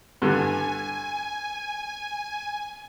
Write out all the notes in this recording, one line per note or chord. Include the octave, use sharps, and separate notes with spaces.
G2 D3 G#5